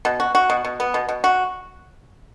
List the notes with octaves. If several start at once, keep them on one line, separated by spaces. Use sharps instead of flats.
B2
F#4
F#4
B2
B2
B3
B2
B2
F#4